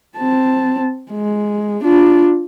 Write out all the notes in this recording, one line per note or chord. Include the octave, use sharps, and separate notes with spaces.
C4 A5
G#3
D4 F4